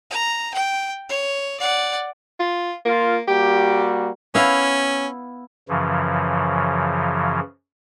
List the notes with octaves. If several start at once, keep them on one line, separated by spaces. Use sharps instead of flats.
A#5
G5
C#5
D5 F#5
F4
A#3 F4
G3 A#3 F#4 G4
B3 C#4 E4 F5
F#2 C#3 E3 F3